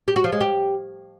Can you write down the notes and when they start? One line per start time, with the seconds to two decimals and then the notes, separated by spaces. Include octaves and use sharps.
0.08 G4
0.16 F#4
0.24 F3
0.32 G#3
0.41 G4